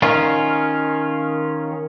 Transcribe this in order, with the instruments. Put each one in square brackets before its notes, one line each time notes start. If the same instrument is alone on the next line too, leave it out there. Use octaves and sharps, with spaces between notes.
[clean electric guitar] D#3 C#4 F4